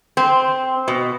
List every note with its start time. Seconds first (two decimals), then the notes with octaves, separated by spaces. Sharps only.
0.17 C4
0.88 B2